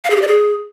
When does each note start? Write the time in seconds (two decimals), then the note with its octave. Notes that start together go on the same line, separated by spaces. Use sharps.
0.04 F5
0.10 G#4
0.16 G4
0.22 D5
0.28 G#4